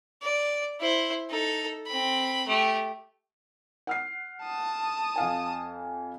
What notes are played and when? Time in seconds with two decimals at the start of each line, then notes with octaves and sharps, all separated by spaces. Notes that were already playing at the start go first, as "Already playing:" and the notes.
0.22 D5
0.80 E4 C5
1.30 D#4 A4
1.87 C4 B5
2.47 A3 G4
3.87 F#5 F6 C7
4.43 A5 D#6
5.16 F2 F5 G#5